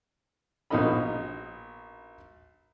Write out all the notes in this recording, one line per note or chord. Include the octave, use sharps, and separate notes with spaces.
A#1 B2 D#4 A#4 D#5 B5